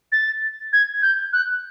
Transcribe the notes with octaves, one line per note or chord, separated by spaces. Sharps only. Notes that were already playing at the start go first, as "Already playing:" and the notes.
A6
G#6
G6
F#6